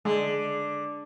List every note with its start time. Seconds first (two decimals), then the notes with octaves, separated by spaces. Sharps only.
0.05 D3 G#3